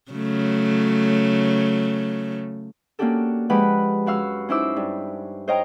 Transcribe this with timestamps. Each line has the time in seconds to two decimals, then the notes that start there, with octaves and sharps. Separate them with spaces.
0.12 C#3 F#3 A3
2.99 A#3 C#4 D4 F#4 G4 A4
3.50 F3 G#3 G4 B4 F#5 B5
4.06 F#2 F#4 F5 E6
4.49 C#4 D#4 E4 C5 D6 E6
4.76 G2
5.48 C5 C#5 D#5 F5 G5 A#5